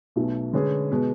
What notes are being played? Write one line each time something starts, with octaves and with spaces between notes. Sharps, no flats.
B1 B2 F#3 A3
D3 G#3 C#4 G#4 B4
B2 G#3